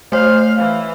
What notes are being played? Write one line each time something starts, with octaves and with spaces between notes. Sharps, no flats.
A3 C5 C#5 F5
E3 F5